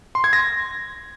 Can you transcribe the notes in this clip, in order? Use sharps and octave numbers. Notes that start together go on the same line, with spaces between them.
C6
G#6
A#6